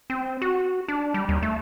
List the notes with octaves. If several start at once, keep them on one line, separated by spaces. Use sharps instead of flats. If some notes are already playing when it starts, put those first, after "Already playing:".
C4
F#4
D4
G3
D#2
A3